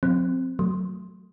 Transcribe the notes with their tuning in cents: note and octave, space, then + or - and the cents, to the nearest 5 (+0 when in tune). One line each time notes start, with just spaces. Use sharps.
F#3 -40 C4 +0
F#3 +0 A3 +0